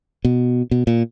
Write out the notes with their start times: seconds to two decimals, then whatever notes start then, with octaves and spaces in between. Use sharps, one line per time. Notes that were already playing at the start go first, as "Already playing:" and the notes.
0.25 B2
0.71 B2
0.87 A#2